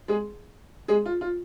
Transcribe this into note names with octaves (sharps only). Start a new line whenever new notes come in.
G#3 G#4
G#3 G#4
F4
F4